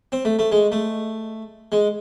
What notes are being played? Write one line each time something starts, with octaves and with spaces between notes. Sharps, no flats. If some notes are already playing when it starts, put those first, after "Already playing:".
C4
A3
A3
G#3
A3
G#3